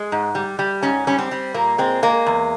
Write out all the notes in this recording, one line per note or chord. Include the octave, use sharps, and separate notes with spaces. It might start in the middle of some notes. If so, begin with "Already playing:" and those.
Already playing: G#3
G#2
G3
G3
G#2 C#4
G3 C#4
C4
G3
A#2 A#3
G#3 C4
G#3 A#3
E2